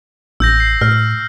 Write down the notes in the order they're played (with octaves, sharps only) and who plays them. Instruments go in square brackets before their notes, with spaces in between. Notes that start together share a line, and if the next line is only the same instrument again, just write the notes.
[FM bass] A1 [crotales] E6 G6 A#6
[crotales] C7
[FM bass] A2 [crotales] F6